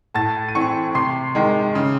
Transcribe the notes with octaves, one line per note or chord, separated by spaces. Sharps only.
A2 A5 A6
D#7
E3 C4 C#6 C#7
C3 C6 C7
D#3 G#3
C#3